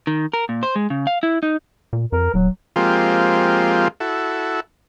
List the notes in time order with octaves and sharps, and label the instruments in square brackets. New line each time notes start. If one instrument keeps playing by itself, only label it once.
[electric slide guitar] D#3
A#4
A#2
C5
G#3
C#3
F5
E4
D#4
[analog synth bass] A#2
[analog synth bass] F2 [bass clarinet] A#4
[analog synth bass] D#1 [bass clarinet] F#3
[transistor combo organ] F3 G#3 A#3 C4 F4 G4
E4 F#4 A4